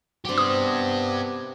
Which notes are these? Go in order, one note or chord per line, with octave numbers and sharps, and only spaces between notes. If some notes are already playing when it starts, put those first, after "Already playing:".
F#3 C4 D4 G4
C3 B3 C#5 C6 D#6